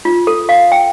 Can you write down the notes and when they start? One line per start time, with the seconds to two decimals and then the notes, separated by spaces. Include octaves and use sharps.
0.05 F4
0.27 A4
0.49 F5
0.72 G5